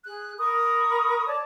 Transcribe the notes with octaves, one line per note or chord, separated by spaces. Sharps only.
G#4 F#6
A#4 B5 C#6 D#6
C#5 D5 A5 D6